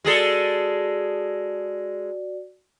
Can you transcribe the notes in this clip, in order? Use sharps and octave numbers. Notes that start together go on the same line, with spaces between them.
G#3 F#4 G#4 A4 D5